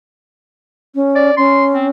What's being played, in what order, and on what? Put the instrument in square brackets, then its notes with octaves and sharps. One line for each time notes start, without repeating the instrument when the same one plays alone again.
[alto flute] C#4
[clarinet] D5
[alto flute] C#4 [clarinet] C6
[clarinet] C4